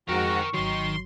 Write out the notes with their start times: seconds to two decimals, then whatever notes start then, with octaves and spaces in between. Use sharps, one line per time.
0.09 F2 G#2 F#4 A#4 G5 C#6
0.54 G#1 D#3 F#3 C6